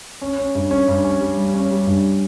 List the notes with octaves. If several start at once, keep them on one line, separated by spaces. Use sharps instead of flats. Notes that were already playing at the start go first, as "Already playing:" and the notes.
C#4
C#4
G2
C#4
G2
C#4
G3
G3
C#4
G3
G2